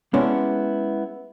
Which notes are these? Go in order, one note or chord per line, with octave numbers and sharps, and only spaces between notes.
G#3 B3 C#4 D4 E4